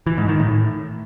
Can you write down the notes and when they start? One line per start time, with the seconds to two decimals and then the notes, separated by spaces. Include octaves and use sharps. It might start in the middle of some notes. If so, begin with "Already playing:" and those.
0.07 E3
0.17 G#2
0.28 D#3
0.39 A2